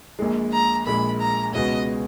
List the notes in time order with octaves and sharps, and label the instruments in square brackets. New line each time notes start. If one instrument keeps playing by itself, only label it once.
[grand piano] A#1 A#2 G#3
[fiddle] A#5
[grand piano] A#1 A#2 G#3 [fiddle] B5
[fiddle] A#5
[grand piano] C#2 B2 G#3 B3 F#4 [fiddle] D#5